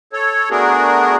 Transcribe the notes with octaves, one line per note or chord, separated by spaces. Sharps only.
A4 C#5
A3 B3 D4 F#4 G#4 A#4